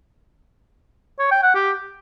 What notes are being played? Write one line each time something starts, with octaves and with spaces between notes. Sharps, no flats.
C#5
G5
F#5
G4